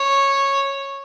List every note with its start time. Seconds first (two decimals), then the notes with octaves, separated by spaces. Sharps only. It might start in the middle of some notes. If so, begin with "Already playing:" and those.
Already playing: C#5